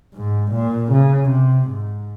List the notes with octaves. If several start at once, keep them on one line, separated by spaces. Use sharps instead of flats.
G#2
A#2
C#3
C3
G#2